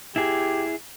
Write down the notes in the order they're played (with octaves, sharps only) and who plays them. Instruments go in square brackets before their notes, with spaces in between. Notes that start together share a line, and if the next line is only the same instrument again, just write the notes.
[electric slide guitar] E4 G#4 [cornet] G4